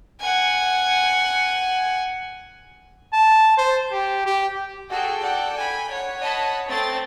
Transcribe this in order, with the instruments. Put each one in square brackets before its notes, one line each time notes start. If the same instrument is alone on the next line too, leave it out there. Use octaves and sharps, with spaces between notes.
[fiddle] F#5 G#5
[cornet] A5
C5
G4
G4
[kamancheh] F#4 G#4 [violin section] A4 G5
[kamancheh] D5 F#5
G#5 B5
C#5 F#5
[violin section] D#5 A5 B5
A3 C4 A6